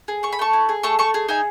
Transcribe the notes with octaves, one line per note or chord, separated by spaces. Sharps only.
G#4
A3 C#6
B5
A3 A5 C#6
E4
G#4
A3 A5 C#6
A3 A5 C#6
G#4
D#4 E5 G#5